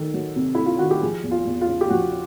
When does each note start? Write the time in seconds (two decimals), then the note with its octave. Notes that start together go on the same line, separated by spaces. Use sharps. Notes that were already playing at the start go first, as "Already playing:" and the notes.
Already playing: D#3 A3 A4
0.14 F#3
0.36 C3
0.55 A3 E4
0.66 F4
0.79 D#3 F#4
0.91 G4
1.02 F3 G#4
1.23 E2
1.31 F4
1.46 E2
1.61 F4
1.68 C#3
1.81 G4
1.90 F3 F#4